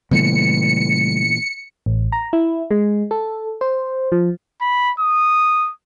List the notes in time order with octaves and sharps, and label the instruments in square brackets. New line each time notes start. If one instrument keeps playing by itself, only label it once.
[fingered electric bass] A#2 E3 B3 [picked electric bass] C#3 G3 A3 [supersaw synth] C#7
[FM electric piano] A1
A#5
E4
G#3
A4
C5
F3
[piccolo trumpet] B5
D#6